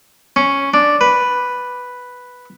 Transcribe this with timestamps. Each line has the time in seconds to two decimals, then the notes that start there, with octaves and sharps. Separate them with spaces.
0.36 C#4
0.74 D4
1.01 B4